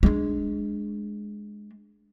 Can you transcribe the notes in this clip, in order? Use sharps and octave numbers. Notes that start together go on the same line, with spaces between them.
G#3 D4